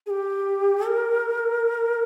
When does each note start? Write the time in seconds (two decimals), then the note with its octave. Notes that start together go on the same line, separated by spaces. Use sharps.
0.06 G#4
0.10 G4
0.87 A#4